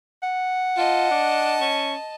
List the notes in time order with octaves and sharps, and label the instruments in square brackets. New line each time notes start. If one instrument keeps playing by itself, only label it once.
[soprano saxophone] F#5
[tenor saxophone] F4 [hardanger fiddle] D#5 A5
[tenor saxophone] D4
C#4